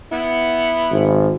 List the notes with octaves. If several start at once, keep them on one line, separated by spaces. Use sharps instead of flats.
B3 E4
G#1